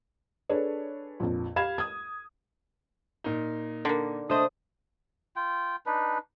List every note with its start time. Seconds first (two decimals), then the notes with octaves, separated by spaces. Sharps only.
0.49 D4 G#4 A4 B4 C#5
1.20 A#1 F2
1.56 G4 F5 B5 G#6 E7
1.78 D#6 G#6
3.24 A#2 D#4
3.85 D3 A#3
4.30 C2 A3 D4 C5 D#5 D#6
5.36 F4 G5
5.86 D4 D#4 B4